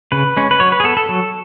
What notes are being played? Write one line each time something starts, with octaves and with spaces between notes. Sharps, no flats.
C#3 B4
G#3 C#4
B4
F#3 C#5
B4
G#4
B3 A4
A4
F#3